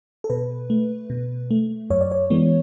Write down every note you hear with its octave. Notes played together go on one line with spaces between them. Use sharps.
A4
B2 B4
A3
B2
A3
F#2 C#5
D5
C#5
E3 G#3 B3